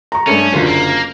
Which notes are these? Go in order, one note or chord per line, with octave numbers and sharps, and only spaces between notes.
A#5 C#6
G2 A3 C#4
F#1 D#2 D3 F4
A#3